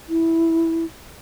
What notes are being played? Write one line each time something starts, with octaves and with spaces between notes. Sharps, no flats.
E4